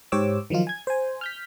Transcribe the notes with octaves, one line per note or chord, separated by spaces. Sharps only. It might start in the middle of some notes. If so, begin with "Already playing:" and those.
G#2 G4 C5 C#5 D6 E6
D#3 F3 F#3 D#4 F4
G#5 G#6
C5 G#5
F6 G6 B6